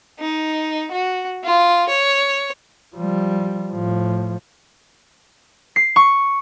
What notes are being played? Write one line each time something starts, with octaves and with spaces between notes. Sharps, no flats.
D#4
F#4
F4
C#5
F3 G3
A2 F3
C7
C#6